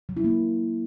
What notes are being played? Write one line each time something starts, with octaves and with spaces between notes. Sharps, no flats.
F#3
E4
A#3